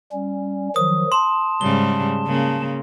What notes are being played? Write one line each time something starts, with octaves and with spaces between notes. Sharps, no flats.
G3 C#4
D#3 F3 F#3 D#6
A5 C6
G#2 C#3 G3 G7
C#3 A#3